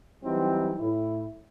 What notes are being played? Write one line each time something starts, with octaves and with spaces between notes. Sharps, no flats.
E3 F#3 G3 C4 D#4
A2 E4